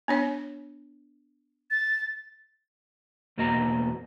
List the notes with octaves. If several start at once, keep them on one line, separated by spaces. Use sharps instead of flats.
B3 D4 C#5
A6
E2 B2 A#3 F#4 D#5 A#5